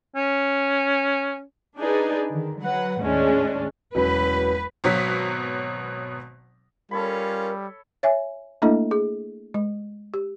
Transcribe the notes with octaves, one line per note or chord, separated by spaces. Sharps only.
C#4
D4 D#4 G#4 B4 D5
D3 D#3
F#3 B4 F#5
D#2 A2 G#3 C#4 D4
E1 F#3 C#4 B4
G#1 B2 F#3 B6
G3 C#4 F4 A4 A#4 C#5 B5
C#5 E5 G#5
A3 A#3 D4 E4 A4 D#5
G#4
G#3
G4